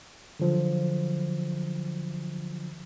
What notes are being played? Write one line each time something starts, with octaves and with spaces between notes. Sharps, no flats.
D3 F3 F#3